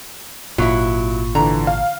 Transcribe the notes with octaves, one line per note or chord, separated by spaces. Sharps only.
G#1 A#2 F#3 E4 F4 C#6
D3 E3 A#5
F5